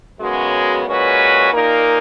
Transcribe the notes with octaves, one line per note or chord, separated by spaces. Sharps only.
F#2 C#3 G#3 B3 F#4
A#2 G#3 C#4 F#4 B4
A#2 A#3 D#4 A#4